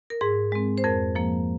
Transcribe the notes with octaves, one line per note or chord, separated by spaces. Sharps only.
A#4
G#2 G#4
G#3 C4
C5
F2 A#4
F3 A#3